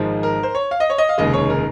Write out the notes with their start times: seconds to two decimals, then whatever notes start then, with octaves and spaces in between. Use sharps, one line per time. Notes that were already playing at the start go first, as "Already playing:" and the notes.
Already playing: G#1 G#2 F3 G#3
0.23 A#4
0.43 C5
0.55 C#5
0.71 F5
0.80 D#5
0.90 C#5
0.98 D#5
1.09 F5
1.18 F1 D#2 C#3 G#3 D#5
1.33 C#5
1.50 A#4